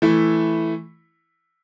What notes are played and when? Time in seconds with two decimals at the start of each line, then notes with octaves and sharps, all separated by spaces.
0.02 E3 A3 E4